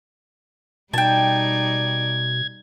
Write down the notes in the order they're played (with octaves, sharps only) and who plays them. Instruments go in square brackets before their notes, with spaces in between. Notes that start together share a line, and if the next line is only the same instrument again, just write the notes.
[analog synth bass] B2 [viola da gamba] G3 D#4 D5 [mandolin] G5 A5 [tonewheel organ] G#6